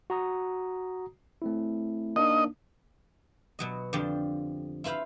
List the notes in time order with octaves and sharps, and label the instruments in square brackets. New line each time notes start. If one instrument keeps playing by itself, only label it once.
[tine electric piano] F#4 A#5 D#6
A3 C4 E4
[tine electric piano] A#3 D4 D#4 [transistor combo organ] D#5
[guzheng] B2 F#3 D#5
F2 D3 F3 G4
E4 F4 B4 C5 F5